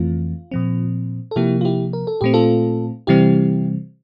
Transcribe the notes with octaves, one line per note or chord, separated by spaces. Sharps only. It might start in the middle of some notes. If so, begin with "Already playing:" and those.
Already playing: F2 E3 A3 C4 F4
A#2 F3 C4
A4
C3 F3 A#3 E4 G4
F4
E4 G4
A#4
A4
A#2 A3 C4 G4
F4 A4
C3 E3 G3 C4 E4 G4